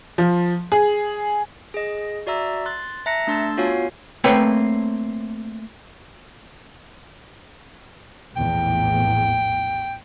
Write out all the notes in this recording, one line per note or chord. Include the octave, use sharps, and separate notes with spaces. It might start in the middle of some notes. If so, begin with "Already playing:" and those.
F3
G#4
G#4 D#5
F#4 D5 E5 A#5 E6
C6 F#6 A6
E5 A5 A#5 F#6 A#6 C#7
A3 D4 A5 C6 E6 A6
B3 F4 F#4 C#5 F5 G#5
A3 A#3 C4 B4 C#5 G5
A#1 E2 A2 G5